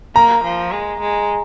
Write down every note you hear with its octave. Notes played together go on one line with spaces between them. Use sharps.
A#3 A#5
F3
G#3
G#3